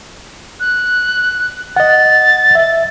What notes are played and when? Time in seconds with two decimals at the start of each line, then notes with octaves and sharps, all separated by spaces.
0.60 F#6
1.76 D#5 F#5 A6
2.55 E5